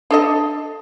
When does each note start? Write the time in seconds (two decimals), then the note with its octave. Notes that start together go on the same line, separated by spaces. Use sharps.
0.11 D4 A4 D#5